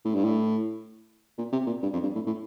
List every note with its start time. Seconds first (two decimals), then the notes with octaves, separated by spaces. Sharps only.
0.05 A2
0.15 G2
0.25 A2
1.38 A#2
1.53 C3
1.67 A#2
1.83 G2
1.93 F2
2.03 G2
2.15 A2
2.27 A2